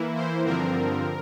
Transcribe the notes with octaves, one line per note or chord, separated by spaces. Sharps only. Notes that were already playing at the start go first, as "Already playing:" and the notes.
Already playing: E3 A#3 E4
C5
G2 D3 F3 C4 A#4